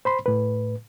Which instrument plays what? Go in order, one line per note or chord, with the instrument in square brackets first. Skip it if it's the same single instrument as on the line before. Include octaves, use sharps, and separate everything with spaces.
[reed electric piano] C5 B5 C6
A2 B4